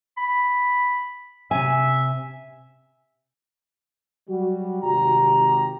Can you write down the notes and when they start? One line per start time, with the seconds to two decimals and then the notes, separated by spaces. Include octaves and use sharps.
0.17 B5
1.51 C3 E5 G#5
4.29 F#3 G3 F#4
4.83 G#1 C3 G4 G5 A#5